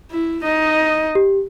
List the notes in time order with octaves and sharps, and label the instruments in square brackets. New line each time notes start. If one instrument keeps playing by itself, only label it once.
[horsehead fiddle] E4
D#4 D#5
[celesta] G4